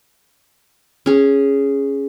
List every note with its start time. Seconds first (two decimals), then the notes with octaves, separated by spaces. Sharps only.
1.06 C#4 G#4